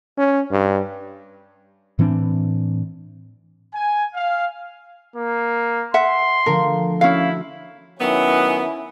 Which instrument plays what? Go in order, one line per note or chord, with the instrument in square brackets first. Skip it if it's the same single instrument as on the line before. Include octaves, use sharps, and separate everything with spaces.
[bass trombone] C#4
G2
[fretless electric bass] A2 E3 C4 D4
[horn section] G#5
F5
[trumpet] A#3
[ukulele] E5 F#5 [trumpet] C6
[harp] D3 F3 A3 [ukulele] A#4
[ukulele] C#4 F5 [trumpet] E4 [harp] F#4 E5
[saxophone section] D#3 F#3 B3 [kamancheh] C#4 E4